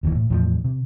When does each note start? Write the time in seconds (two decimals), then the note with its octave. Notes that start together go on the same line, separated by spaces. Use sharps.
0.03 F1 D#2 B2 E3
0.15 A2
0.30 E2 A2 E3 F3
0.64 C3